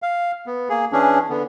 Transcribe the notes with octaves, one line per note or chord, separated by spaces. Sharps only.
F5
B3
A#3 G#4
E3 C#4 D4 G#4
D3 B3